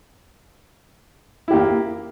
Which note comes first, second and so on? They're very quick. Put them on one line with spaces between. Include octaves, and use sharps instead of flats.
E4 G4 A#3